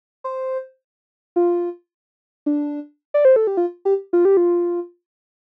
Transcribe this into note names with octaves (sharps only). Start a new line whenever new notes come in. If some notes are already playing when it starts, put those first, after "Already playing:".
C5
F4
D4
D5
C5
A4
G4
F4
G4
F4
G4
F4